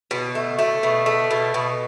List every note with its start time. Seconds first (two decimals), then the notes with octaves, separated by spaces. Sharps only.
0.11 B2
0.35 A3
0.59 A3
0.83 B2
1.06 A3
1.31 B2
1.54 B2